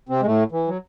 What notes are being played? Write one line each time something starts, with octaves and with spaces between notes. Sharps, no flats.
C3 C4
G#3
A2 A3
E3
F#3